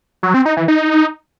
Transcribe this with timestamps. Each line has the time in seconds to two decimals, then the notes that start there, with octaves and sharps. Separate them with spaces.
0.23 F#3
0.34 C4
0.45 D#4
0.57 E3
0.68 D#4